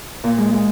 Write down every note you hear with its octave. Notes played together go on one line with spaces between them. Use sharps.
A#2
G#3
G#3